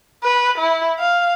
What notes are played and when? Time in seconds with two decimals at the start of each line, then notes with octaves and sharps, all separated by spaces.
0.24 B4
0.58 E4
0.99 F5